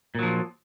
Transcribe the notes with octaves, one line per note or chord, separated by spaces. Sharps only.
A#2 F3 F#3